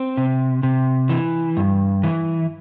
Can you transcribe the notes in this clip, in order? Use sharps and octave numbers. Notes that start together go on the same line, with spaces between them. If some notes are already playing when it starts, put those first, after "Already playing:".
Already playing: C4
C3
C3
E3
G2
E3